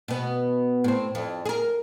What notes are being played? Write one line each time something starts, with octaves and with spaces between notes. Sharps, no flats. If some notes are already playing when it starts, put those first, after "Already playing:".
B2 B3
A2 C4
F2
G#4 A#4